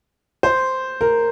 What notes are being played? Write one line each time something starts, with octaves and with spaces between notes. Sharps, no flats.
C5
A#4